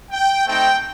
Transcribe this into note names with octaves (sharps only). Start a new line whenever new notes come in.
G5
A3 C4 D#4 G5